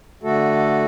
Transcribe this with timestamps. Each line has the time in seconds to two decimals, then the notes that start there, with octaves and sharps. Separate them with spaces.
0.23 D3 A3 F#4 A4